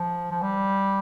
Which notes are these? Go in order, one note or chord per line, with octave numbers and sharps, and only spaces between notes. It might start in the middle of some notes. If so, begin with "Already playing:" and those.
Already playing: F3
F3
G3